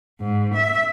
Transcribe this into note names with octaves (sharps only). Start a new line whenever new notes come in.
G#2
E5